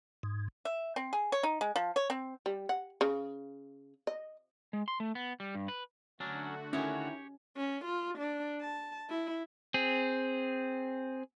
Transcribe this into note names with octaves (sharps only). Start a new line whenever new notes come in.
G#2
E5
C4
G#4
C#5
D#4
G#3
F3
C#5
C4
G3
F#5
C#3
D#5
G#3
C6
A3
B3
G3
G2
B4
D3 F#3 A3 C#4 D4 F#4
D#3 C#4 E4 G4 C#5
C#4
F4
D4
A5
E4
C4 G#4